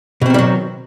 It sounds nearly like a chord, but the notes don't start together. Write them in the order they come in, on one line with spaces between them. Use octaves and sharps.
B2 C4 D#3 G3 F#3